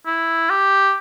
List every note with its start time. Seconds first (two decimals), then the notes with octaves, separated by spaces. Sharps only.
0.06 E4
0.50 G4